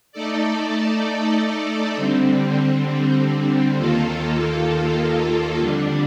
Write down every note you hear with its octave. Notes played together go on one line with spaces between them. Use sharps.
A3 D#4 A4 D5
D3 G3 C4
D#2 D#3 A#3 F4 A4
F2 D3 G3 D4